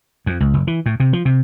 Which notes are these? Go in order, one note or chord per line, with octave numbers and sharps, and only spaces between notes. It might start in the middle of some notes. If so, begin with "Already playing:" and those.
F2
C#2
F#1
E3
A2
C3
F3
C3